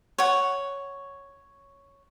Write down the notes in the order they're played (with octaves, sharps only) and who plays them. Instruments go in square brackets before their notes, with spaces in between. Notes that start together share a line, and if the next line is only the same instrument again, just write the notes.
[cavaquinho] C#5 F#5